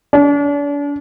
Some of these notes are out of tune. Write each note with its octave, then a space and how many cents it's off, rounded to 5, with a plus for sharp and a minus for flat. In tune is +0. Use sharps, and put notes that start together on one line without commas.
D4 -40